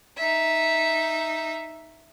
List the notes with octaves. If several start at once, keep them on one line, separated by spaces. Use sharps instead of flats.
D#4 E5